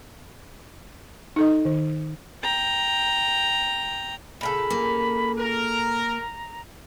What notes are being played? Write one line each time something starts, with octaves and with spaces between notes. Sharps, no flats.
D#4 A4 D#5
D#3
G5 A#5
A#2 C#3 A4 B5
A#3
A#4 A#5